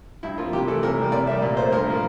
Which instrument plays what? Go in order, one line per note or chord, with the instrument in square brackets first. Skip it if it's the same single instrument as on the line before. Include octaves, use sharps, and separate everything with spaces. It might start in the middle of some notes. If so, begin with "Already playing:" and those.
[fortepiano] G2 E4
F3 A#3 F4
C3 G4
E3 A3 A4
C3 A#4
G3 A#3
C3 D5
G3 A#3 E5
A#2
A3 C5
G2 A#4
F3 A#3